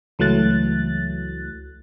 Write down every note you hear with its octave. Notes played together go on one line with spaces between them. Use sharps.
C#2 E3 F#3 A3 F#6 A6